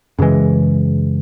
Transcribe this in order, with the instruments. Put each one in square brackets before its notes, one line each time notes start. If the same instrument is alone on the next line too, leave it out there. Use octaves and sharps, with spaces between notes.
[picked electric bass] F#2 C#3 E3 G#3